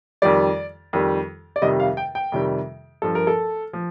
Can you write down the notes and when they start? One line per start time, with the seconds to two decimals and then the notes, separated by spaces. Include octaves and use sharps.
0.22 F2 D#3 G3 D5
0.93 F2 D#3 G3
1.56 D5
1.62 F2 C3 D#3 G3 D#5
1.80 F5
1.97 G5
2.15 G5
2.32 F2 C3 D#3 G3
3.02 G2 F3 A4
3.15 A#4
3.27 A4
3.73 F3